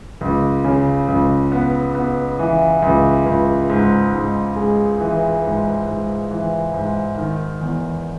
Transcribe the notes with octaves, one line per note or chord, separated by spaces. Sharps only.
C#2
C#3
C#2
B3
B3
E3
C#2
C#2
G#2
G#2
G#3
E3
G#2
G#2
E3
G#2
D#3
E2